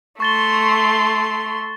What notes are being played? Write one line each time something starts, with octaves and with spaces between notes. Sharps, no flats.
A3 C6 C#6 A6 G7